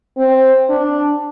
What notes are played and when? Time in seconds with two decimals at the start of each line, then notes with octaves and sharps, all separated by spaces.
0.17 C4
0.70 D4